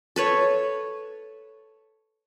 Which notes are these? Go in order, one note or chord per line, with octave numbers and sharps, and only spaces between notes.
A4 B4 C#5